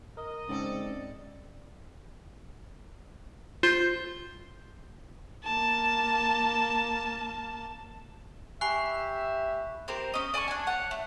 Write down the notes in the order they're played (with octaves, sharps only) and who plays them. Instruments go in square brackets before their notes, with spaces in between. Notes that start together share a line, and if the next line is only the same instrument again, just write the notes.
[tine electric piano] A#4 [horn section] D#5
[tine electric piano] G#2 C4 [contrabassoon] C#3 [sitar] A4 D5
[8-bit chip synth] F4 [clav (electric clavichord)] C5
[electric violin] A#3 A5
[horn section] G4 E5 [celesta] G#5 C7 [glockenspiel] B5 C#6 F#6
[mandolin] C4 G4 A#4 C5
C#4 D#5
D5 G#5 A5 C#6
D4 G#5
C#5 F#5
A3